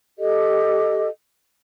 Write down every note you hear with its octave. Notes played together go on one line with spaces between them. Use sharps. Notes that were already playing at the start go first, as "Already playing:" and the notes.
G4 A4 D#5